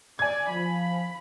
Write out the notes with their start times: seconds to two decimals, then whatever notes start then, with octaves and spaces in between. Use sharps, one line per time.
0.19 D5 G#5 G#6
0.49 F3 B5